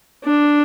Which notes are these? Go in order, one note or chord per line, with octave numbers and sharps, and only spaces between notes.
D4